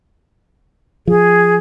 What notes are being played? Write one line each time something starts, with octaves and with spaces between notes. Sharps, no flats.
F3 G#4